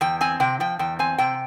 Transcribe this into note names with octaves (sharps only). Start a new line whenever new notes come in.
E2 G5
C4 G#5
C3 G5
F3 G5
E2 G5
C4 G#5
C3 G5